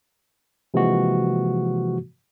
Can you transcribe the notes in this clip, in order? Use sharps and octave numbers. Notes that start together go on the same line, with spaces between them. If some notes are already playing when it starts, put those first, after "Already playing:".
C3 E3 F3 G#3 A#3 F#4